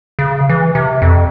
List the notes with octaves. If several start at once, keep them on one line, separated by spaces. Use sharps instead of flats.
C#3
E3
C3
F2